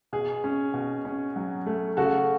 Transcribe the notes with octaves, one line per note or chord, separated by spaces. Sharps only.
B2 G#4
C#4
B2
C#4
F#3
A3
C#3 F#4 A4